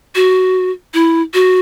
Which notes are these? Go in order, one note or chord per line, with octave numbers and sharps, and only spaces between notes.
F#4
E4
F#4